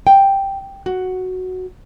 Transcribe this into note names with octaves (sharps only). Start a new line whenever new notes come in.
G5
F#4